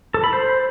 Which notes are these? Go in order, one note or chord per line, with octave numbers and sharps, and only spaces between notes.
A4
B5
C5